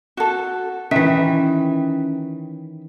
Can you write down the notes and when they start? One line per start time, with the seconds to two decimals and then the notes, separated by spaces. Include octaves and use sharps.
0.17 F#4 A4
0.91 D#3 E3 C#4 E5